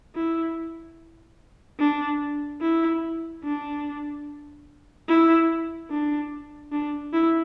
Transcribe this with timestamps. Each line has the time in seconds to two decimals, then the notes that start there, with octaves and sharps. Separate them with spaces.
0.15 E4
1.80 D4
2.62 E4
3.44 D4
5.09 E4
5.90 D4
6.72 D4
7.13 E4